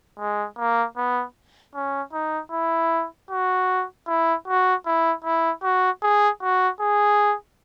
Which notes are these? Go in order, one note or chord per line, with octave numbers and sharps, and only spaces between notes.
G#3
A#3
B3
C#4
D#4
E4
F#4
E4
F#4
E4
E4
F#4
G#4
F#4
G#4